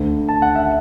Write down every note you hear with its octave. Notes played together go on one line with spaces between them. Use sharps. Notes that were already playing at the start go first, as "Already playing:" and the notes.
Already playing: D2 D3 A3
A5
F#5
E5